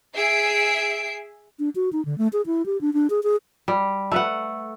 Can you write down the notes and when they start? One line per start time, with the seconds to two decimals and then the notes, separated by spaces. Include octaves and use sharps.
0.15 G#4 E5 C7 D7
1.59 D4
1.75 F#4
1.93 D#4
2.05 D3
2.18 A3
2.33 G#4
2.46 E4
2.66 G4
2.81 D4
2.93 D4
3.10 G#4
3.23 G#4
3.68 G3
4.12 A3 B4 F#5